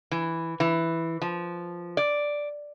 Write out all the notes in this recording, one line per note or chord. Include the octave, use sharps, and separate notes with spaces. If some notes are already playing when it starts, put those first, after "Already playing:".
E3
E3
F3
D5